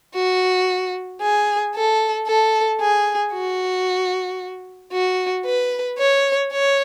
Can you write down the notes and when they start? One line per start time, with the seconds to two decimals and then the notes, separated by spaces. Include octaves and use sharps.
0.15 F#4
1.22 G#4
1.75 A4
2.27 A4
2.81 G#4
3.33 F#4
4.92 F#4
5.45 B4
5.98 C#5
6.52 C#5